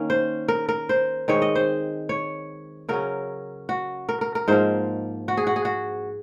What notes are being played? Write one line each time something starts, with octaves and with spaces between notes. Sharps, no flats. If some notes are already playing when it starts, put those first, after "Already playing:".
Already playing: D#3 A#3 C#4
C5
A#4
A#4
C5
D#3 G#3 C4 C#5
D#5
C5
C#5
C#3 F#3 C#4 A#4
F#4
A#4
A#4
A#4
G#2 F3 A#3 C5
F#4
G#4
F#4
G#4
F#4